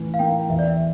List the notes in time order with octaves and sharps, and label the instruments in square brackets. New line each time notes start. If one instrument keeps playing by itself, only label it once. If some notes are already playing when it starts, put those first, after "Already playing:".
Already playing: [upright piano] A2 E3 E4
[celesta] F5
[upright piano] A#3 [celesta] G5
[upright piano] E2 [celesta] E5
[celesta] D5
E5